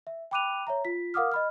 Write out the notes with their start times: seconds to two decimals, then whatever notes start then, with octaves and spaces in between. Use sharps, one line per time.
0.07 E5
0.31 G5 B5 D6 F#6 D#7 F7
0.67 C#5 E5 A#5
0.85 F4 B6
1.14 A#4 F5 F#5 D6 D#6 F6
1.32 D#5 B5 F6